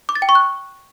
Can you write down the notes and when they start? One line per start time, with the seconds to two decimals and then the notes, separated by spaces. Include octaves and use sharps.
0.09 D6
0.15 A6
0.22 G5
0.29 C#6
0.35 F#6